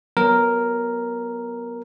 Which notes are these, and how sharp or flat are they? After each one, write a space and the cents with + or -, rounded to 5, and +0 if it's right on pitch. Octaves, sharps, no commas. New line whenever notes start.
F#3 +0 B3 -20 A#4 +0